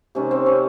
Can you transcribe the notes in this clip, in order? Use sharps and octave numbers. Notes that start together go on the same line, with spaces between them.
C3 D#3 G#3 C#4
C4
C#4